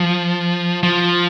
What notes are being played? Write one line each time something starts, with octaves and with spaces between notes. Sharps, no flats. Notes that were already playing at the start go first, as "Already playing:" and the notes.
Already playing: F3
F3